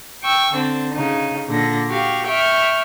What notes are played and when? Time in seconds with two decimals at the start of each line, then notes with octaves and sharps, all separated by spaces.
0.23 G5 C#6 E6
0.53 D3 C4
0.94 C#3 D#4
1.49 A#2 D3 A#6
1.89 F#4 G4 F5
2.26 E5 G5 C#6 F6